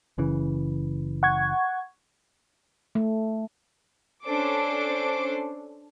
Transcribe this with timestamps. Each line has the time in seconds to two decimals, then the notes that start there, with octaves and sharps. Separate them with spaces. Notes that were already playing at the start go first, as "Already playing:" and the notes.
0.18 F#1 C#3 E3
1.23 F#5 C#6 G#6
2.95 A3
4.26 C#4 D4 A4 C5 D6